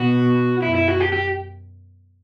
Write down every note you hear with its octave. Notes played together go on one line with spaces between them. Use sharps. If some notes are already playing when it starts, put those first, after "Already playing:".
Already playing: B2 F#4
F#2 E4
E4
F#4
G4
G4